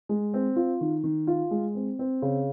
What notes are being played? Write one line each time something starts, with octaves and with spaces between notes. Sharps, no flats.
G#3
C4
F4
D#3
D#3
F4
G#3
C4
C4
C#3